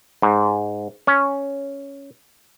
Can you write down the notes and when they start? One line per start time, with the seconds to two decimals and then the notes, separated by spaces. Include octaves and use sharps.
0.22 G#2
1.07 C#4